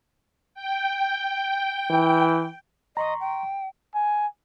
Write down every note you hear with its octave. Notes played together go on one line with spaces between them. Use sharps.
G5
E3
D#5 A#5 C6 C#6
G5
G#5